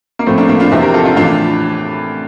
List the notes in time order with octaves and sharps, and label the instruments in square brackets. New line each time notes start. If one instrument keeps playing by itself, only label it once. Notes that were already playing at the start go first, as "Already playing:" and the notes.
[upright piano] A#3
A2 F3 A3 C4
A#3 D4
A#3 D4
D4 F4
E2 C3 F3 C4 E4
G4 A#4
F4 A4
D4 F4
A2 E3 D4 F4